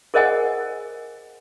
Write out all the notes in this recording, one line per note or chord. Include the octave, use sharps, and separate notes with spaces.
G#4 A#4 C5 D#5 F#5 G#5